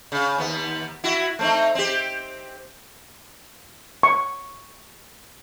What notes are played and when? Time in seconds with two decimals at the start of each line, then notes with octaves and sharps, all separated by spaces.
0.12 C#3
0.38 D#2 B3
1.04 E4 F#4
1.39 A3 C4 D#4
1.75 C4 G4
4.03 C#6